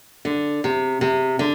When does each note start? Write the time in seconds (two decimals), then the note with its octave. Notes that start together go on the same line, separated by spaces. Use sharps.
0.25 D3
0.64 C3
1.01 C3
1.39 D3